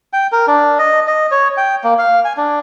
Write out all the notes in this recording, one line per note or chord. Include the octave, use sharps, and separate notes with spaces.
G5
A#4
D4
D#5
D#5
C#5
G5
A#3
F5
G#5
D4